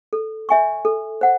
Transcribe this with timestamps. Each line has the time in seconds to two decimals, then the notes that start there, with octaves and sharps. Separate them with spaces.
0.13 A4
0.49 C#5 E5 G#5 C#6
0.85 A4
1.21 C5 F#5